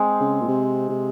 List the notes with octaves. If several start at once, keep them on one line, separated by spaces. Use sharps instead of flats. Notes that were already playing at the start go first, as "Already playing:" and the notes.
Already playing: G#3 C4
C#3
A#2
C3
C3